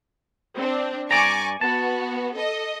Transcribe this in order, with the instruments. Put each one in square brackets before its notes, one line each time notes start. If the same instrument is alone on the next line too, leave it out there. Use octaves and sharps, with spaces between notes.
[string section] C4 D4
[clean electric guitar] G2 D5 A#5 [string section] G#5 C#6 D6
[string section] B3 F#4 [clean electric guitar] A5
[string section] A4 D#5